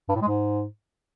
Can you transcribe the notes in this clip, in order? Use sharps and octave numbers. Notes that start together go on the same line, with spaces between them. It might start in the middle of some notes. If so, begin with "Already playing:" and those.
G2
A2
G#3
G#2